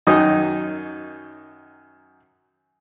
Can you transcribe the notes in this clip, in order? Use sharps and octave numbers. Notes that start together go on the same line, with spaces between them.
F#2 D#3 F#3 D#4 D#5